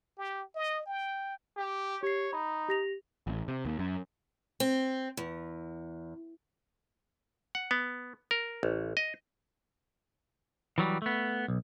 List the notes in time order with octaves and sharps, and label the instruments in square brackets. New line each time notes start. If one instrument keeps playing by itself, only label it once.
[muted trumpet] G4
D#5
G5
[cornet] G4
[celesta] G4 C7 [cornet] C#5
[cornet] D#4 [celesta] B5
[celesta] G4 A#6 F7
[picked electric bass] A1
C3
D#2
F#2
[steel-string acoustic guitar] C4
E2
[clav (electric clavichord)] F#5
B3
A#4
A1
D#5
[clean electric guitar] E3 F#3 G3
A3 B3
B1